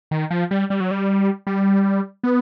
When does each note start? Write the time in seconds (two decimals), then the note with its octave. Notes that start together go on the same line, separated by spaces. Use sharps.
0.11 D#3
0.31 F3
0.51 G3
0.70 G3
0.80 F#3
0.91 G3
1.47 G3
2.23 B3